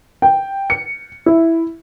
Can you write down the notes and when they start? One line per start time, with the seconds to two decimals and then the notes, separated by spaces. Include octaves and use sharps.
0.22 G5
0.70 C#7
1.26 E4